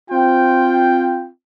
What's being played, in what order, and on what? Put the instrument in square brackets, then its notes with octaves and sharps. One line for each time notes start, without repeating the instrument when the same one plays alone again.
[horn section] C4 F4 G5